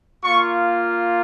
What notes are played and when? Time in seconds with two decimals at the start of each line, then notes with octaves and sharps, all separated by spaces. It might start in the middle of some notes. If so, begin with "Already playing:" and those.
0.24 A#3 F4 C#6